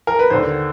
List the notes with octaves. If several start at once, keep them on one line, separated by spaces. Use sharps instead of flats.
A#4
B4
D#2 D3 C5